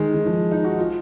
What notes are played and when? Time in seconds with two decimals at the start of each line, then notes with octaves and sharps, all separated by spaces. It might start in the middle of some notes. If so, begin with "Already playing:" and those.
Already playing: D#3 G#3
0.14 D#3
0.26 F3
0.52 D#4
0.64 F#4
0.78 F4